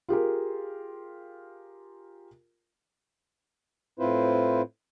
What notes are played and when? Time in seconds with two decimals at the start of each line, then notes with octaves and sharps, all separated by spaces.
0.09 F4 G4 G#4 A#4
3.99 A2 C4 E4 F4 B4 C5